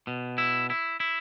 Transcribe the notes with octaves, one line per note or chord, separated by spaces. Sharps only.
B2
E4
E4
E4